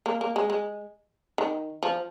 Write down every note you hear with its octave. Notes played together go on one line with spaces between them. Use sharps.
A#3
A#3
G#3
G#3
D#3
F3